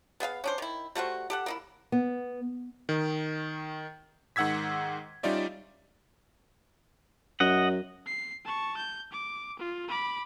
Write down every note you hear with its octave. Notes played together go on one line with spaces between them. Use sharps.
B3 G#4 E5 F5
C#4 D4 C5
D#3 E4
G3 A3 F#4 C5
G4 A4 F#5
A#3 D#4 E4
B3
D#3
G#2 D#3 F#5 E6 G#6 B6
G3 C#4 D#4 F4 D5 E5
F#2 D#5 F#5
C7
A5 C#6
G6
D6
F4
B5 D6